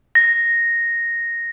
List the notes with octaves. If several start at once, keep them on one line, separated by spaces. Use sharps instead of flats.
A#6